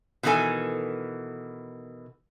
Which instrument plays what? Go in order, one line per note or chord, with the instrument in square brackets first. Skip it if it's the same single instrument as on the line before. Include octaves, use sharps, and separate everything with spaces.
[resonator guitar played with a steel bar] B2 D#3 E3 E4 A4 G#5